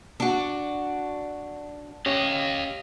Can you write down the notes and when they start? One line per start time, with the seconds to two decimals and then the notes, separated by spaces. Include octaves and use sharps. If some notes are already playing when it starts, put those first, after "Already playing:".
0.20 D4 F#4
2.06 C#4 G4 C#5 D#5 F5